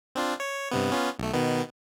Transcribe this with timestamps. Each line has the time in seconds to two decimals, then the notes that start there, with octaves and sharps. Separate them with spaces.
0.15 C4 D4 F4
0.40 C#5
0.71 G2 C3 B3
0.91 B3 C#4 F4
1.19 B1 A3
1.33 B2 D#3 B3